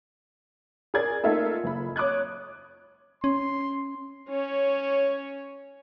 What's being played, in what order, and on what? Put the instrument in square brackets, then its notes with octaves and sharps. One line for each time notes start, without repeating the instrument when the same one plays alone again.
[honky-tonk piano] G#4 A#4 D5 G#6
A3 A#3 D#4 F4 A4 E5
F#1 B5
C#5 D6 D#6 F#6 G#6
[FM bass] C#4 [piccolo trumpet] C6
[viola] C#4 C#5